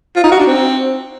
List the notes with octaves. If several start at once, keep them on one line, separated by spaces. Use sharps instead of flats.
F4
D#4
F#4
D4
C4